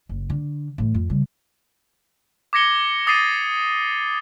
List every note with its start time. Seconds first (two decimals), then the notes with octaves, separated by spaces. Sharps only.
0.09 F#1
0.30 D3
0.78 A2 E3
0.94 F2
1.10 C#3 G3
2.53 D6 G#6 A#6 C#7 G7
3.06 D6 D#6 A6 C7 D#7